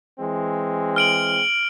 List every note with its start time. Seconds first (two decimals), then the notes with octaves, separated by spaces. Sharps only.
0.19 E3 G#3 C4
0.96 F6 D7 F#7